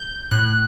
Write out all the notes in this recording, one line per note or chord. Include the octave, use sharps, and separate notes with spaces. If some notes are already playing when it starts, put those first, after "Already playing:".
Already playing: G6
A2 F#6